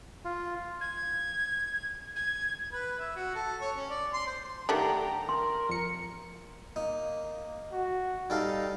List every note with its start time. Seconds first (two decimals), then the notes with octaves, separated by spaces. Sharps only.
0.25 F4
0.81 G#6
2.16 G#6
2.73 B4
2.99 E5
3.16 F#4
3.35 A4
3.61 C#5
3.76 C#4
3.90 D5
4.14 C6
4.27 C5
4.69 D#3 A3 D4 G4 F#5 G5 A#5
5.29 A#4 C6
5.69 F2 C#7
6.76 A#3 D#4
7.72 F#4
8.30 G3 D#4 A4 F5